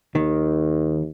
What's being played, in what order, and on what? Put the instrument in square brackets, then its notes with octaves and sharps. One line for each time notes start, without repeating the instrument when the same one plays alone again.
[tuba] D#2 [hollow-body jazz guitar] D#3